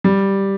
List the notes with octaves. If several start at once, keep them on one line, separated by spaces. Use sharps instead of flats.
G3